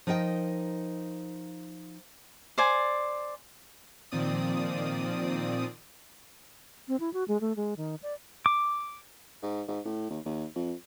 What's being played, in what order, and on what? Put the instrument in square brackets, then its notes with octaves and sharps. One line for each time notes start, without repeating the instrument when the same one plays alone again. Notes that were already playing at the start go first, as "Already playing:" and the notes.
[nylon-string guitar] F3 D#4 A#4 D#5 G5
[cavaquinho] C5 D5 G#5
[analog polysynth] A#2 D#3 F3 C4 D5 D#6
[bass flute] C4
E4
F#4
G#3
A3
G#3
D#3
D5
[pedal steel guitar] D6
[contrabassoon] G#2
G#2
A2
D#2
D#2
F2